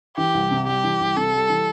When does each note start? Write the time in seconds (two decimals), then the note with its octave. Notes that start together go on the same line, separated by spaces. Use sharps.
0.17 E3 G4
0.34 C2
0.51 C3
0.67 G3 G4
0.84 E3
1.00 C2
1.16 C3 A4
1.33 G3
1.49 E3